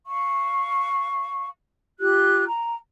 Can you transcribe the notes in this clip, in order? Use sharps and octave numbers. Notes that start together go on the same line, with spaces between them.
F5 C#6
F4 G4 F#6
A#5